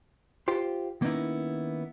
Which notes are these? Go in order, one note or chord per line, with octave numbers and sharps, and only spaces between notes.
F4 G4 C5
D#3 A#3 B3 C#4 D#4 E4